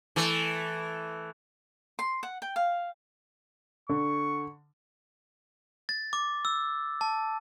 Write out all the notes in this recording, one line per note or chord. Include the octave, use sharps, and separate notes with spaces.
E3 A3
C6
F#5
G5
F5
D3 C#6
A6
D6
E6
A5